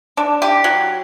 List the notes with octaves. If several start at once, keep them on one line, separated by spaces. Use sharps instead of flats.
D4
G4
F#3